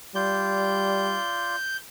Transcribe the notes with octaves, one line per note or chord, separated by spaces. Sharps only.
G3 F4 D5 G6